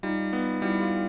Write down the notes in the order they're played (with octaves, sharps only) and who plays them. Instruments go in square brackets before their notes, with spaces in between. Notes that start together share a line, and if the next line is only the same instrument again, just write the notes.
[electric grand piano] G3 [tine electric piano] D#4 F4
[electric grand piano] B3
[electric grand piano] G3 [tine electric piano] E4 F#4
[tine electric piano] F4 G4